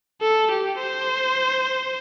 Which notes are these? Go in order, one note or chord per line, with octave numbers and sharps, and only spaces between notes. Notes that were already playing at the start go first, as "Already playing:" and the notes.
A4
G4
C5